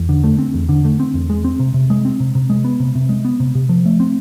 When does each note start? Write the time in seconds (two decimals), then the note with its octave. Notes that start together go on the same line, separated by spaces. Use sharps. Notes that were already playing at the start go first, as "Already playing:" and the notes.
Already playing: E2
0.09 D3
0.24 A3
0.39 C4
0.54 E2
0.69 D3
0.85 A3
1.00 C4
1.14 E2
1.30 G#3
1.45 C4
1.60 C3
1.74 C3
1.90 G#3
2.05 C4
2.20 C3
2.35 C3
2.50 G#3
2.64 B3
2.80 C3
2.95 C3
3.09 G#3
3.25 B3
3.40 C3
3.55 C3
3.69 F3
3.85 A3
4.00 C4